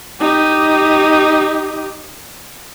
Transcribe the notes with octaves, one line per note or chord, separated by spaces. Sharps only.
D#4 G4